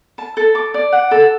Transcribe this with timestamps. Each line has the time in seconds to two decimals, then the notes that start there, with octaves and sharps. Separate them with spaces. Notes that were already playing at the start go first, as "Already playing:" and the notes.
0.18 A5
0.37 A4
0.55 D6
0.74 D5
0.92 F#5
1.11 A4